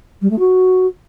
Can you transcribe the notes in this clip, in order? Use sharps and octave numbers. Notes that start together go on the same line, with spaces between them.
G3
A3
F#4